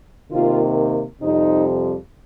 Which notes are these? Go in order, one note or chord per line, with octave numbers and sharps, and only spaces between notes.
C3 D#3 A#3 F4
F2 C3 G3 C4 D#4